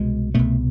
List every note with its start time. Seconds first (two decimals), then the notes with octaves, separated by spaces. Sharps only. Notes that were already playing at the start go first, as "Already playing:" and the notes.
Already playing: C2 B2 G#3
0.34 C2 B2 A3